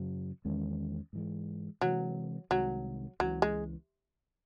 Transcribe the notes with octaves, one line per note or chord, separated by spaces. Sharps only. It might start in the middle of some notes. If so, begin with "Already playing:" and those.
Already playing: F#2 C#3 F#3
E2 D#3 G#3 C#4
G#2 E3 G#3
C3 E3 F#3 G#3
C2 C3 D#3 F#3 G#3
C#2 C#3 E3 F#3
G#3